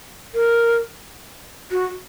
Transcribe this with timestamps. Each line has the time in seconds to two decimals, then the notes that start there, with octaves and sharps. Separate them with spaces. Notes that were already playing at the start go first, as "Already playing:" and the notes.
0.34 A#4
1.71 F#4